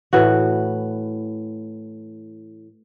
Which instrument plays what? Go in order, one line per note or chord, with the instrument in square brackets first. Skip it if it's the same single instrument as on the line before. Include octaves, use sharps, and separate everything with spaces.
[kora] A2 E3 F#4